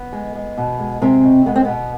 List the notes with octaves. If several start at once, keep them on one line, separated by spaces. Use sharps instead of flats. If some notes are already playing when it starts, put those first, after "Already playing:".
Already playing: B3
G#3
G#3
B2
G#3
C3 G#3 C4
B2
G#3 B3
C4
B2 B3